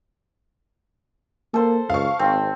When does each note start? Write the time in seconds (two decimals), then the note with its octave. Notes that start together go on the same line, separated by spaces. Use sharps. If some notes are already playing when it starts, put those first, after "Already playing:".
1.54 A#3 A4 C5
1.90 C#2 F5 C#6
2.19 G#1 C4